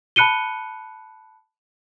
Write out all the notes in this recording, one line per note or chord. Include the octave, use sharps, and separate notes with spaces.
A5 B5 F#6 C#7 D#7 G7